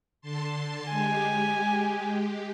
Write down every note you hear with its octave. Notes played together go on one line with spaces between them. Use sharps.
D3 A5 C6
G#3 G4 G#5